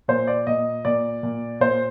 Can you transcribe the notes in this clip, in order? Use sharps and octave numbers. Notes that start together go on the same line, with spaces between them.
A#2 C5
D5
A#2 D#5
A#2 D5
A#2
A#2 C5